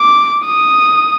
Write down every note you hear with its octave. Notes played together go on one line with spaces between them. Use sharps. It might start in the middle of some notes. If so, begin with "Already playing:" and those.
Already playing: D6
D#6